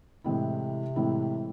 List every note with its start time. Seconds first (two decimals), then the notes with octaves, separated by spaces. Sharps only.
0.24 A2 C3 E3 G#3 C4 E4
0.96 A2 E3 G#3 C4 E4